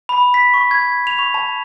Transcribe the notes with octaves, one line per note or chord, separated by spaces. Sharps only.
B5
B6
C#6
G#6
F7
C#6
A5